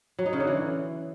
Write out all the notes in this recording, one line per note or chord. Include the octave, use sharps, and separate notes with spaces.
F#3
D#4
C#3
D3
E3